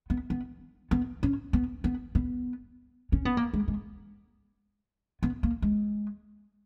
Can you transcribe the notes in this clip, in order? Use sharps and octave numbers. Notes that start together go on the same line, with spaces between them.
B3
B3
B3
C#4
B3
B3
B3
C#4
B3
A#3
G#3
G#3
B3
A#3
G#3